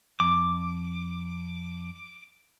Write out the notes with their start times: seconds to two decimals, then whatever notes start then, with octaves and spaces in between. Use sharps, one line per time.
0.20 F2 D6